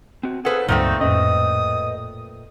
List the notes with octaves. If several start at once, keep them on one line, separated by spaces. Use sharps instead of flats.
C4 F#4
G#4 A4 B4 C5 F5 F#5
C#2 G2 A#2 F#3 A3 C4 D#4
F2 A2 C#4 B4 D#5 D#6